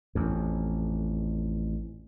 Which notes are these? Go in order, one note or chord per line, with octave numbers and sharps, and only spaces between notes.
A1 F2